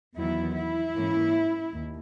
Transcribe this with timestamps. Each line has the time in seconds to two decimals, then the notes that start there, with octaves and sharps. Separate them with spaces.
0.17 E2 D#3 F#3 B3 E4
0.56 E4
0.95 G#2 E3 A#3 C#4
1.72 D#2